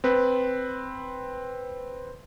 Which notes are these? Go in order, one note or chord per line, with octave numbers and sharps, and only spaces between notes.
C4 B4